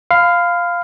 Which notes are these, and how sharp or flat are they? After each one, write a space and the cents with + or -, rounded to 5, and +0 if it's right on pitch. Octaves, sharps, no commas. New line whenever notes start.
F5 +0 B5 +40